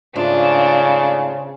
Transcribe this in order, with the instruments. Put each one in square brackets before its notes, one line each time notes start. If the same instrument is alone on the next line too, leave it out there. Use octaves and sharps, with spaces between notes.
[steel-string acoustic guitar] G#2 A3 F4 [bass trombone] C#3 [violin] D4